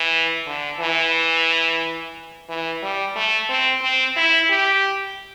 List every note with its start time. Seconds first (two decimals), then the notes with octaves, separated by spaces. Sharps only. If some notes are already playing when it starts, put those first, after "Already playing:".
Already playing: E3
0.47 D3
0.80 E3
2.49 E3
2.82 G3
3.16 A3
3.49 C4
3.82 C4
4.16 E4
4.50 G4